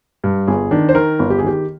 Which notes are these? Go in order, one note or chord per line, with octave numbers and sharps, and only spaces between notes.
G2
G1 G#4
D#3 D4
C5
D#3 A#4
G1
G4
G#4
D#3 G4